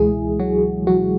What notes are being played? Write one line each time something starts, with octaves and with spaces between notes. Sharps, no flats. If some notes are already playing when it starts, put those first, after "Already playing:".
Already playing: C#2 B2 E3 G#3 E4 G#4
F#3 F#4
F#3 F#4